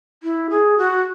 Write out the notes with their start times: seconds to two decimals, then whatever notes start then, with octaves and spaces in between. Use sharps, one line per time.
0.23 E4
0.50 G#4
0.78 F#4